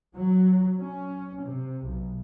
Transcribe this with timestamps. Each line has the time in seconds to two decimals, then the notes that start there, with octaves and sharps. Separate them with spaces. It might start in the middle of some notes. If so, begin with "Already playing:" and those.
0.17 F#3
0.78 C#4
1.43 C3
1.83 B1